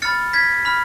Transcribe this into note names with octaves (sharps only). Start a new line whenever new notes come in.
B5 F6 A6 C#7
G#6 B6
B5 F6